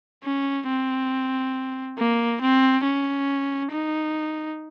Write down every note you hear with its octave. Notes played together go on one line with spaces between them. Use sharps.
C#4
C4
A#3
C4
C#4
D#4